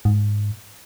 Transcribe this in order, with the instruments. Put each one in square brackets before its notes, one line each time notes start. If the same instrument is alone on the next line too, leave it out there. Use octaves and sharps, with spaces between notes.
[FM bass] G#2